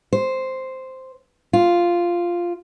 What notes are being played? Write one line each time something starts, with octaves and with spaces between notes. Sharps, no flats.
C5
F4